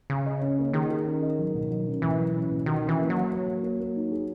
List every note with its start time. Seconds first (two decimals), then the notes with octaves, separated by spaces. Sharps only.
0.10 C#3 C#4
0.26 D#5
0.41 C#4
0.59 A#3
0.73 D#3 G#4
0.90 G#4
1.06 C#4
1.22 D#5
1.39 F#3
1.54 B2
1.70 F#3
1.87 C#4
2.02 B2 E3
2.18 F#3
2.35 C#4
2.51 B2
2.66 D#3 F#4
2.83 C#4
2.89 E3
2.99 A#3
3.10 F#3
3.16 A#3
3.32 A#3
3.48 A#3
3.63 A#3
3.80 A#3
3.96 D#4
4.11 G#4